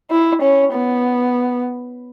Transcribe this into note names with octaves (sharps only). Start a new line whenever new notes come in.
E4
C#4
B3